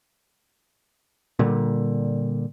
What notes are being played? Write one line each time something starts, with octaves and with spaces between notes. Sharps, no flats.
A#2 D3 G3